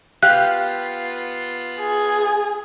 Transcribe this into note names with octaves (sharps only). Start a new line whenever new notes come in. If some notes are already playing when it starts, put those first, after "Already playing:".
B3 F4 G4 F5 F#6
G#4